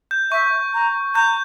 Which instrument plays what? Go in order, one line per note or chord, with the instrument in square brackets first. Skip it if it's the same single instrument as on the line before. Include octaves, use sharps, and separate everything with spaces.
[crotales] G6
[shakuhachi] E5 [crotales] C#6
[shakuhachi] A#5
[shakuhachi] A#5 [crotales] G6